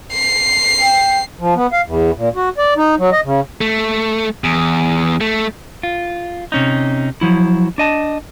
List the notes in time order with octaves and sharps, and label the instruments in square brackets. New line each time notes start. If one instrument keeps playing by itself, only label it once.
[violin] C7
[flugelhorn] G5
[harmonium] F3
B3
F5
E2
A#2
F#4
D5
D#4
F#3
D#5
C#3
[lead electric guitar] A3
E2
A3
[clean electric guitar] F4
C3 C#4 D#4
F3 F#3 E4
D4 D#5 A5